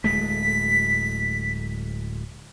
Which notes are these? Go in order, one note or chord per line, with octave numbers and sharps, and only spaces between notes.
D1 G#3 A3 B6